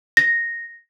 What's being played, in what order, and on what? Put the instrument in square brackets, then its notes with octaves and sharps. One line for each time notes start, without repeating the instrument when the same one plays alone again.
[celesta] A#6